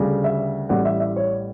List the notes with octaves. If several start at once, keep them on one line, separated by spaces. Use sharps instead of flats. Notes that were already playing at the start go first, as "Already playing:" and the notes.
Already playing: D2 C#3 G3
E5
A1 A2 G3 F#5
E5
E5
C#5